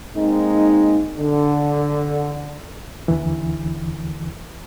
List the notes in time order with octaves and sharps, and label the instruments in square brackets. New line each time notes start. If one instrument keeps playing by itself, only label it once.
[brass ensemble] G#3 A#3 C4 D#4
D3
[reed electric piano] D#2 D3 E3